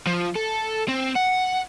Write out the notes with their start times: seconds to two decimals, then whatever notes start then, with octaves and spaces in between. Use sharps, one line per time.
0.07 F3
0.36 A4
0.88 C4
1.15 F#5